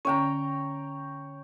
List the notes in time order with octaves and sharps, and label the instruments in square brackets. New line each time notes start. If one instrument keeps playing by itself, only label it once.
[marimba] D3 C#4 [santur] C#5 G5 A#5